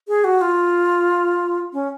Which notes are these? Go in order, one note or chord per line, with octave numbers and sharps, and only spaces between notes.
G#4
F#4
F4
C#4